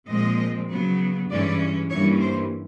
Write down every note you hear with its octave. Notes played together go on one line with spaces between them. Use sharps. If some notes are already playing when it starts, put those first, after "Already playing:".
A#2 F3 G#3 C4 D#5
C#3 F#3 B3
G2 E3 G#3 C#4 D5
G2 E3 G3 A#3 C#4 C#5
C5